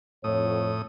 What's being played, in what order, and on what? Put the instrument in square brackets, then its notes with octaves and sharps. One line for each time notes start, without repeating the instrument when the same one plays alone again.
[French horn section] F2 C#5 [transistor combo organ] A2 D#6